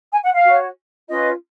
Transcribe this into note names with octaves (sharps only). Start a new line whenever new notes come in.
G#5
F#5
F5
F#4 C#5
C#4 F4 B4 D#5